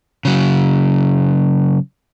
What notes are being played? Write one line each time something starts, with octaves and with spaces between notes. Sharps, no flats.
C#3 F#3